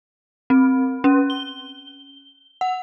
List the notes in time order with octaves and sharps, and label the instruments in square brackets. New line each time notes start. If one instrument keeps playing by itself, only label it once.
[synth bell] C4
C#4
G7
F#5